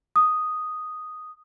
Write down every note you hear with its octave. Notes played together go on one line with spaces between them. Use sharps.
D#6